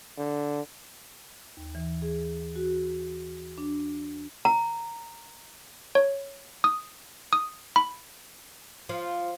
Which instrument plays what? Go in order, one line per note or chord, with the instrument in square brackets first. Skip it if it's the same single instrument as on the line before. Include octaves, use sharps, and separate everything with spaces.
[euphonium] D3
[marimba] D#2
E3
G#4
F#4
D4
[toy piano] A#5
[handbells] C#5
D#6
D#6
B5
[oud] F3